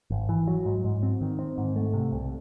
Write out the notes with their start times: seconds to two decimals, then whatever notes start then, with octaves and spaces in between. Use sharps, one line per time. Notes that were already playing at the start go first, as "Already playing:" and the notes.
0.10 G#1
0.29 E3
0.48 F#3
0.65 G#2
0.84 G#2
1.03 C4
1.21 D#3
1.39 C4
1.58 G#2
1.76 A3
1.94 C3
2.12 C2